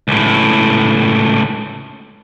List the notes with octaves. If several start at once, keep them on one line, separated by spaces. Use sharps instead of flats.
C#2 A2